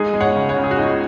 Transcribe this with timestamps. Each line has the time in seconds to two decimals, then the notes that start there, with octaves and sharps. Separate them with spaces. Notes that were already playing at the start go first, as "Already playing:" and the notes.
Already playing: G#3 D#4 G#4
0.14 G#3
0.20 C#5 F#5
0.35 C#3
0.49 C#5 F#5
0.57 C#3
0.64 G#4
0.71 F#4
0.78 C#2 D#4